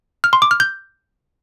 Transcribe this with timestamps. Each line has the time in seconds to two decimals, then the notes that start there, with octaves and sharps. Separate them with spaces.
0.24 F6
0.33 C6
0.42 D6
0.51 F6
0.60 G6